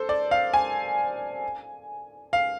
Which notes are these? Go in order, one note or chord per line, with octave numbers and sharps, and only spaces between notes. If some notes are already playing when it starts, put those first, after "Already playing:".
Already playing: A4 C5
D5
F5
G#5
F5